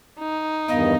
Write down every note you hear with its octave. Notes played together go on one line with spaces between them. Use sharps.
D#4
E2 G2 D#3 B3 D#5 F5